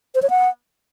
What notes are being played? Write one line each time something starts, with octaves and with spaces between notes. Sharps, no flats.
C5
C#5
F#5